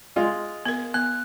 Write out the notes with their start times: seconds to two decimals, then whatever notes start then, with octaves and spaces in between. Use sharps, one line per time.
0.16 G#3 F4
0.66 B3 A#4
0.94 B3 F#6